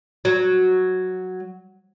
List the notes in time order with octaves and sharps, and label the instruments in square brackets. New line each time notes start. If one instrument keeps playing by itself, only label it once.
[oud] F#3